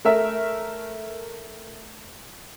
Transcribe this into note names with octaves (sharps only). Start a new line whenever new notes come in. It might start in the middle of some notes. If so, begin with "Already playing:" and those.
A3 A#4 E5